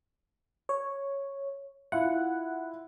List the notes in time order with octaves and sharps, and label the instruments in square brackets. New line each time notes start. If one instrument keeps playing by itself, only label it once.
[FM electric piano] C#5
[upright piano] E4 F4 [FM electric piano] F#5